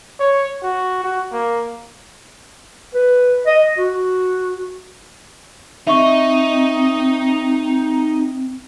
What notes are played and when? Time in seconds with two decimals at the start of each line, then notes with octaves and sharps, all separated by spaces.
0.20 C#5
0.62 F#4
1.04 F#4
1.32 A#3
2.94 B4
3.46 D#5
3.78 F#4
5.87 C4 D#4 E5 C#6